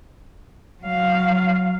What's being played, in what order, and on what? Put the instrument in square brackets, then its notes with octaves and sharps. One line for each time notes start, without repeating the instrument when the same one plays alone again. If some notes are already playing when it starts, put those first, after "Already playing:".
[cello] F#3 F5